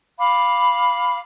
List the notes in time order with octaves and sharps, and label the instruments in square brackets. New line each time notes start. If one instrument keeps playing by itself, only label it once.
[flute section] F5 B5 D6